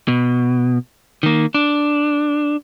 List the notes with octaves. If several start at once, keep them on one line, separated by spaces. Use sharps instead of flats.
B2
D#3 A#3
D4